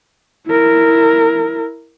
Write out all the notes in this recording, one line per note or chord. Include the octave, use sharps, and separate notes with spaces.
E4 A#4